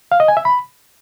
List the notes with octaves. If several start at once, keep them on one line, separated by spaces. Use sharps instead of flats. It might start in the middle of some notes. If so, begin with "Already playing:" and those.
F5
D#5
G#5
E5
B5